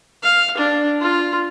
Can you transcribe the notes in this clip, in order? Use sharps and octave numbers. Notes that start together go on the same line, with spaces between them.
F5
D4
F4